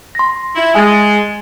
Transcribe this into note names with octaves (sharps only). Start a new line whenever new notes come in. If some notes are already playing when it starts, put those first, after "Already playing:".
C6 A#6
E4
G#3 G#5 A6